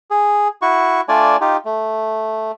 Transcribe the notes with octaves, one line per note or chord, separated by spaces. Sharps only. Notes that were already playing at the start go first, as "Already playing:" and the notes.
G#4
E4 F#4 C#6
A3 D4 F4 D5 G#5
D#4 F4 G4
A3